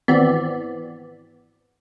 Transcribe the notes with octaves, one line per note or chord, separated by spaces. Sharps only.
G#1 E3 B3 C4 D5